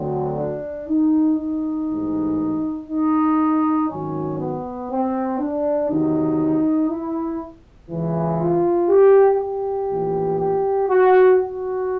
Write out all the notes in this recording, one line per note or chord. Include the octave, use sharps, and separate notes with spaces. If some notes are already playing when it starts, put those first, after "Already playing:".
Already playing: D2 D3 F#3 C4
D4
D#4
D#4
A1 G#2 E3
D#4
G#1 G#2 D#3 F#3 C#4
B3
C4
D4
E2 C3 D#3 F#3 D#4
E4
C#2 C#3 E3
F4
G4
G4
A#1 A2 E3
G4
F#4
F#4